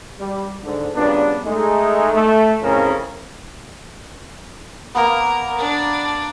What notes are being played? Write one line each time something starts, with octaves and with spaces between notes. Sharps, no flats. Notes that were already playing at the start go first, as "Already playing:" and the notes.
G3
G#2 D3
G2 A#2 C#3 B3 D4
G#3 A3 D#4
A3
F2 A2 C#3 C4 C#4 A#4
A#3 B3 A#4
D4